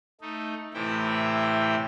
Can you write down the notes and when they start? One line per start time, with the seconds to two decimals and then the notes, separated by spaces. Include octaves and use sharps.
0.21 A3 D#4
0.74 A2 C3 E3 E4 G5